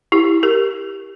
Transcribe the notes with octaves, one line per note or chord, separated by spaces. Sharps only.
E4 G4
G4 A#4